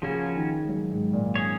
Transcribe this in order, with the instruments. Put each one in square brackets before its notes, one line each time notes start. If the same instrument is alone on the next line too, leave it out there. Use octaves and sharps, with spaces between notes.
[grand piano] C#3 [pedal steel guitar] F3 A#3 C#4 F#4
[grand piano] D#3
G#3
F#3
G#2
A#2
[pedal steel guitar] C#4 G#4 C#5